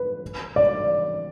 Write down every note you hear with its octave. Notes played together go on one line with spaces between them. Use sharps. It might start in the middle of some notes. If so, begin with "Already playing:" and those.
Already playing: B4
D5